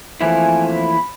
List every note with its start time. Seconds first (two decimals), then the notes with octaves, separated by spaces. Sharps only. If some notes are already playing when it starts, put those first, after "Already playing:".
0.21 E3 F3 A3 A#3 C4 E4 G#5
0.72 B5